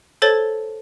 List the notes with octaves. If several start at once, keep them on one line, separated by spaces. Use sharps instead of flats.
A4 C5 C#5 A5 A6 G7